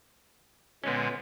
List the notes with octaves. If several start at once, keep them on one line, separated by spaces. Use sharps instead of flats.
A#2 D3 G#3 B3 C#4